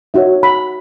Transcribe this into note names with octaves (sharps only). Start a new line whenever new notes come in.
D#4 F#4 C#5 E5
B5